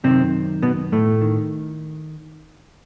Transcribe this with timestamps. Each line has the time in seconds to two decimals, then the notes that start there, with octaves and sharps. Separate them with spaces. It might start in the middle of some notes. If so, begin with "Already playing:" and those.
0.04 F#2 C3 D#3 C4
0.62 B2 B3
0.92 A2 A3
1.22 D#3